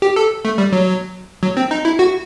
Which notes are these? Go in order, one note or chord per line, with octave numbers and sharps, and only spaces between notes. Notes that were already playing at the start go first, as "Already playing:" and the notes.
G4
A4
A3
G3
F#3
F#3
C4
D#4
E4
F#4